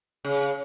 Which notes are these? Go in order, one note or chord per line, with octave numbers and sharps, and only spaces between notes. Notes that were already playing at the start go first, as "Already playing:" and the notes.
C#3